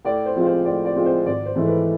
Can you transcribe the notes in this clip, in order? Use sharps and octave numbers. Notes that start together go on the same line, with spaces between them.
A2 D5
C5
F3 G#3 C4 F4
C5
A2 D5
D5
F3 G#3 C4 F4
C5
G#1 D5
C5
G#2 E3 A3
B4